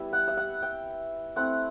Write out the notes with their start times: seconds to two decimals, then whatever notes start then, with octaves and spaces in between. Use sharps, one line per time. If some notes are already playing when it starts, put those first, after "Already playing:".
Already playing: G3 B3 E4 E5
0.13 F#5
0.28 E5
0.37 F#5
0.62 G5
1.36 A3 C4 E4 F#5